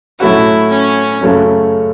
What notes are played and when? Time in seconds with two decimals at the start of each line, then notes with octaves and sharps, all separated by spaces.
0.19 A2 F#3 A3 C#4 E4 F#4
0.70 C#4
1.21 F#2 C#3 F#3 A3 C#4